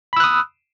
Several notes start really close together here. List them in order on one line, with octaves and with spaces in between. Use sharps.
B5 E6 F#6 D#6